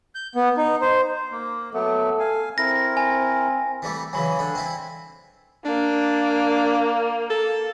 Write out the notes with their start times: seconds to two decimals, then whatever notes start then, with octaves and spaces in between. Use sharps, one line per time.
0.15 G6
0.35 B3
0.57 D#4
0.82 C5
1.32 A#3
1.74 F#3 A3 B3 A4
2.20 F5 G#5
2.58 C4 E4 A#4 A#6
2.97 G#5
3.82 E3 G3 A3
4.13 C#3 E3 F#3 G#5 B5
4.39 D3 D4
4.55 C4 E4
5.65 A#3 D4
7.30 A4